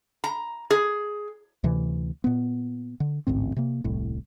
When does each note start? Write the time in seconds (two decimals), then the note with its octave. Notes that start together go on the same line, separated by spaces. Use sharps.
0.24 A#5
0.71 G#4
1.64 D2 C3 E3
2.24 A#2 B3
3.00 D3
3.27 A1 D2 G#2 C4
3.56 C3 A#3
3.84 D#1 C2 A2